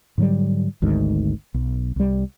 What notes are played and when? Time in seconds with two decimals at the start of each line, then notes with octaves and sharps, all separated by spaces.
0.18 G#2 D3 F#3 G3
0.82 G#1 D2 G#2 D#3
1.54 B1
1.96 C2 G3